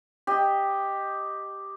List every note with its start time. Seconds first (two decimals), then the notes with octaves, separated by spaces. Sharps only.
0.27 G4 D#5